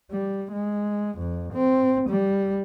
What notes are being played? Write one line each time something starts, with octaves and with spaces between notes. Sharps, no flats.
G3
G#3
F2
C4
G3